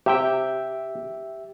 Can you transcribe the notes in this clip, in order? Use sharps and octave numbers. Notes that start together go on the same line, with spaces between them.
C3 G4 E5 G5